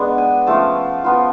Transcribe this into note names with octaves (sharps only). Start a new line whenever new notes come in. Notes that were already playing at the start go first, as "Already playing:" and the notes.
Already playing: G#3 B3 D4
G#5
F3 A3 C#4 F4 A5
F3 B3 F4